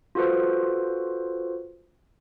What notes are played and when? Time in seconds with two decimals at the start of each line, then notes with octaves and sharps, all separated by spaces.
0.15 F4 F#4 A4 B4 C5